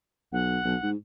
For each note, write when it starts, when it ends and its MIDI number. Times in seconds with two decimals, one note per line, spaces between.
0.33 0.58 35
0.33 0.90 78
0.65 0.76 35
0.83 0.95 44